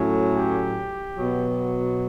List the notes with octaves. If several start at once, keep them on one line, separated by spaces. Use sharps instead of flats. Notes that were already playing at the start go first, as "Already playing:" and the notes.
Already playing: A2 F#3 A3 C#4
G4
B2 F#3 B3